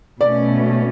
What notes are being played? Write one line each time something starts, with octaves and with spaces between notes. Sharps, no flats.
B2 A3 C#4 D5